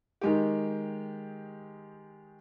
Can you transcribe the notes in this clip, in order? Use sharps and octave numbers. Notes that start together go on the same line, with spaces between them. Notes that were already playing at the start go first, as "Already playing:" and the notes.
D#3 G#3 G4